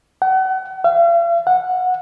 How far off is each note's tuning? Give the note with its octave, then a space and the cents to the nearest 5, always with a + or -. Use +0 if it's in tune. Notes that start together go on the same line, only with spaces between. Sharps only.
F#5 +35
F5 -45
F#5 -15